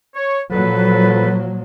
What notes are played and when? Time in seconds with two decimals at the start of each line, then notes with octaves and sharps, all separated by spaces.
0.15 C#5
0.52 A#2 F3 F#3 A4 B4